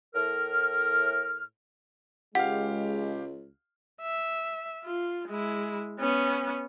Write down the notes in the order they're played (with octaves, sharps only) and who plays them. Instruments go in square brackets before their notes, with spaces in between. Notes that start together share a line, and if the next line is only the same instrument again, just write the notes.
[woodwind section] A2 A#4 F6
[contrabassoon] C#2 [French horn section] G#3 [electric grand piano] G4 F5 [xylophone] F#5
[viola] E5
F4
G#3 E4
B3 C#4